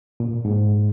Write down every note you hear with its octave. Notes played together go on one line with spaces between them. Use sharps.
A#2
G#2